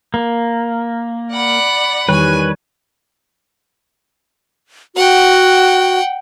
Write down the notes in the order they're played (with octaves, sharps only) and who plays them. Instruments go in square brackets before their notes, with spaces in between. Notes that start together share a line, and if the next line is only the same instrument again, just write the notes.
[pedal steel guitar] A#3
[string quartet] D5 F#5 B5
[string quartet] E2 G#5 [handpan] D#3 G3 C#5 [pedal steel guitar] B4
[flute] F#4 [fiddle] F#5 G5